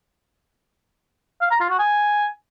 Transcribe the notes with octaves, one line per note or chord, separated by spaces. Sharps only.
F5
A#5
F4
F#4
G#5